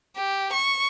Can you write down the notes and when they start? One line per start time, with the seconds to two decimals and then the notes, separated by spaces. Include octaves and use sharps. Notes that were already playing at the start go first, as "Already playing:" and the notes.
0.16 G4
0.53 C#6